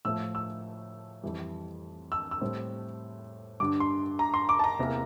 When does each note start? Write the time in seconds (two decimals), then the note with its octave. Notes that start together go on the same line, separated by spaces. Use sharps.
0.05 A2 F3 A3 E6
0.35 E6
1.23 F2 E3 G3
2.12 E6
2.31 E6
2.41 A2 G3 C4
3.60 G2 D3 G3 D6
3.80 C6
4.19 A#5
4.34 C6
4.49 D6
4.59 A5
4.64 A#5
4.79 E2 C3 E3 A#3